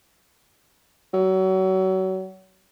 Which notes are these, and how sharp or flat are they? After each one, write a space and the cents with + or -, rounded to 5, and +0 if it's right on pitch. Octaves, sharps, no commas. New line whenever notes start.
F#3 +30